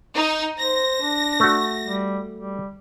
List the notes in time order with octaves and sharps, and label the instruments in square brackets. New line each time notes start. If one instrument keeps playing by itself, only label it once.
[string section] D#4
[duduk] C5 [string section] A#6
[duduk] D4
[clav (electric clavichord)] A3 F#4
[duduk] G3
G3